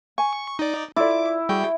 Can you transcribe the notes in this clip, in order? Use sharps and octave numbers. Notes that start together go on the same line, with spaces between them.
G#5 C#6
D#4 D5
E4 F4 A4 D5 D6
G3 F#4 G#4 G5